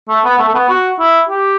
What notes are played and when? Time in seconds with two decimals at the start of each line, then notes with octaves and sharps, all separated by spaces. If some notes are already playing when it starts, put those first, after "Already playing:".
0.09 A3
0.25 B3
0.38 A3
0.49 A3
0.54 B3
0.69 F#4
0.99 E4
1.29 G4